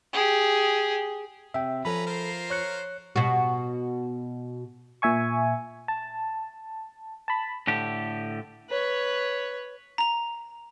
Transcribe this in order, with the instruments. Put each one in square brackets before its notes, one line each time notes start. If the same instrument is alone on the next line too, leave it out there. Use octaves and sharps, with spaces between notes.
[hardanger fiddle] G4 G#4
[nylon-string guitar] C3 [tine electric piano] E5 G5
[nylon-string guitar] F3 [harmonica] C#4 B4 A#5 [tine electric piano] A4 B5
[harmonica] F4 A#4 C5
[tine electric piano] C#5 F#6 C#7
[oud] B2 F#4
[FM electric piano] A#2 E5 G#5 C#6
A5
A5 B5
[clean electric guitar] A2 D3 G4
[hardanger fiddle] B4 C#5
[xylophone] A#5 F7